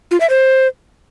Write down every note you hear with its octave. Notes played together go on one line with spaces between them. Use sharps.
F4
E5
C5